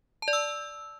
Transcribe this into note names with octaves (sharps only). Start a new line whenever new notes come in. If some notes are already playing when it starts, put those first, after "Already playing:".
A5
D5
E6